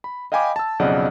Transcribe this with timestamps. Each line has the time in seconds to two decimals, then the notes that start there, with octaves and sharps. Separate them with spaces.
0.04 B5
0.32 D#5 F5 G5 G#5 B5 D6
0.56 A5 E6
0.79 B1 F2 C#3 D5 D#5 F#5